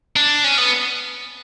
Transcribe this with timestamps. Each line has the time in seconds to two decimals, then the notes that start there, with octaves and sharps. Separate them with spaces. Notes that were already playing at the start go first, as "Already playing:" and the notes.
0.16 D4
0.44 C#4
0.58 B3